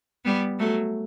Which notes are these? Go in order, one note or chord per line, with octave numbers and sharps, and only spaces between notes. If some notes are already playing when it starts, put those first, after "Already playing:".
G3 B3
F#3 A3